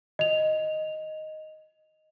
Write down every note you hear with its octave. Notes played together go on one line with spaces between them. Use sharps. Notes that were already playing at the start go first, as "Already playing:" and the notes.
D#5 F7